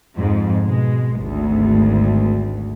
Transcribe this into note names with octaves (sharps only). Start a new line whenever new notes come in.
F2 G#2
B2 G#3
G#1 D2